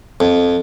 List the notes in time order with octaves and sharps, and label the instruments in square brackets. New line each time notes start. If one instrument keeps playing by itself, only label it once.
[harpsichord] F2